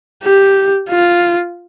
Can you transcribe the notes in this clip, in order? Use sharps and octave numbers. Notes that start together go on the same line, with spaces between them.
G4
F4